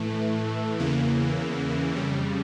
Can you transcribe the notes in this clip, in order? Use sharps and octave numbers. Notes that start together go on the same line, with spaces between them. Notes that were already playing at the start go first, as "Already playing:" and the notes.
Already playing: A2 E3 A3
E2 C#3 E3 A#3
F2 C#3 G3